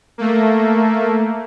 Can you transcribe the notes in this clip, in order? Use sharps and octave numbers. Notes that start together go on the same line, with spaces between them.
A3 A#3